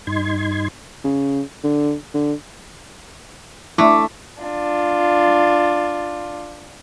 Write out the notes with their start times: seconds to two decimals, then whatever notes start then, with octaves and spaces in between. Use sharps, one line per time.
0.07 G2 D#4 C6 G#6
1.04 C#3
1.63 D3
2.14 D3
3.78 A3 D4 E4 D6
4.41 D4 F4